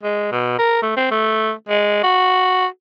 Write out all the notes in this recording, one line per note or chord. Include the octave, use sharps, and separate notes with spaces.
G#3
B2
A#4
A3
C4
A3
G#3
F#4